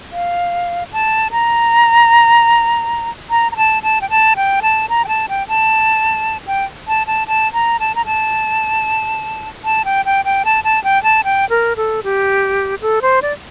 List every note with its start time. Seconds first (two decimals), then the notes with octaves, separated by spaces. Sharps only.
0.12 F5
0.93 A5
1.31 A#5
3.31 A#5
3.52 A#5
3.57 A5
3.83 A5
4.01 G5
4.10 A5
4.36 G5
4.62 A5
4.89 A#5
5.05 G5
5.08 A5
5.29 G5
5.48 A5
6.47 G5
6.88 A5
7.07 A5
7.28 A5
7.53 A#5
7.80 A5
7.95 A#5
8.06 A5
9.64 A5
9.85 G5
10.05 G5
10.25 G5
10.45 A5
10.64 A5
10.84 G5
11.03 A5
11.24 G5
11.50 A#4
11.77 A4
12.04 G4
12.82 A4
13.02 C5
13.22 D5